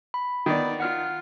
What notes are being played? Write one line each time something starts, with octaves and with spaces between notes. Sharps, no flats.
B5
D#3 B3 D5
F4 F#5 F6